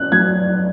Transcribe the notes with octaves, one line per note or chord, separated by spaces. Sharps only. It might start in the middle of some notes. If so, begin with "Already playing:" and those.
Already playing: C#4 F#6
F#3 G#6